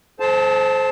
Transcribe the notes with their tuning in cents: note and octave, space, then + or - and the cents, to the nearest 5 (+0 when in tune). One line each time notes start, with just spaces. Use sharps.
A4 -45 C5 +0 A5 +0